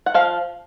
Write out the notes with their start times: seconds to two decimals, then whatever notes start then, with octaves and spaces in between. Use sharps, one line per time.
0.06 F#5
0.14 F3 F5